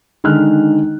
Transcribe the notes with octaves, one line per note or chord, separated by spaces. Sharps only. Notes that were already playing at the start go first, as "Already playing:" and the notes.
D3 D#3 G#3 F6 F#6